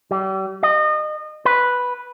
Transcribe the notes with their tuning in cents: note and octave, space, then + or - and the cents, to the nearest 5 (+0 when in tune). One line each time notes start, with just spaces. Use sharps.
G3 -40
D#5 -30
B4 -5